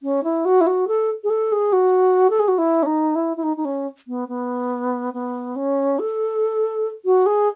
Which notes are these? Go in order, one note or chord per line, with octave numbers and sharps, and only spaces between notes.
C#4
E4
F#4
E4
F#4
A4
G#4
A4
G#4
F#4
A4
G#4
F#4
E4
C#4
D#4
E4
E4
D#4
D#4
C#4
B3
B3
B3
C#4
A4
F#4
G#4